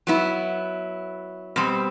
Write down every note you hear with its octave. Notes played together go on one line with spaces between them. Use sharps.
F#3 B3 E4
B2 G3 C4